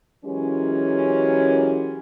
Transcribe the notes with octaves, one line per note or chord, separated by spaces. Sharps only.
E3 F#3 G#3 C#4 G4 A#4